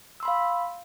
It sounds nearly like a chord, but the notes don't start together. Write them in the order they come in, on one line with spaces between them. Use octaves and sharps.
E6 C6 B5 F5